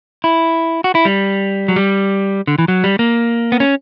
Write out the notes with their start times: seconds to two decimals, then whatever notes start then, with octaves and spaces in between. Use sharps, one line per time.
0.24 E4
0.84 F#4
0.95 E4
1.05 G3
1.68 F#3
1.76 G3
2.47 D3
2.59 E3
2.68 F#3
2.84 G3
2.99 A#3
3.52 B3
3.60 C#4